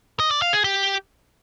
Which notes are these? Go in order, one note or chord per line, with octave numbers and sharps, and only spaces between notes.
D#5
D5
F5
G#4
G4